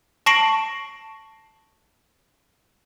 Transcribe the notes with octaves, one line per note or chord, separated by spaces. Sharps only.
A5 C#6 A#6 C7 D7 F#7